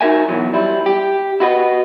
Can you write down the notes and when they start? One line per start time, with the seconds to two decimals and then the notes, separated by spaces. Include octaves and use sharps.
0.01 D#4 F#4 A#4 E5 G#5
0.28 B2 E3 F#3
0.53 G3 E4
0.86 G4
1.40 E4 F#4 B4 D#5